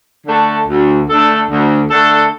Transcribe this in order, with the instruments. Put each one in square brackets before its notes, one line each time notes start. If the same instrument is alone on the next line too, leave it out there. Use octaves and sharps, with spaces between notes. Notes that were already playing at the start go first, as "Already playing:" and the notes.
[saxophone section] D3 A3 D4 A4
D2
D3 A3 D4 A4
D2
D3 A3 D4 A4